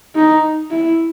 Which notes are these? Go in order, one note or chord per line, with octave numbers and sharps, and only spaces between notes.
D#4
E4